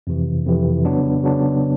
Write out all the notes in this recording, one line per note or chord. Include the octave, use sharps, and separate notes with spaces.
F2 C3 E3
F2 C3 E3
C#3 F#3 B3 D4
C#3 F#3 B3 D4